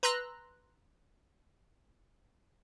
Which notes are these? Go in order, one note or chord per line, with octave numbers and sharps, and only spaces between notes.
B4 A#5 C6 E6 F#6 A#6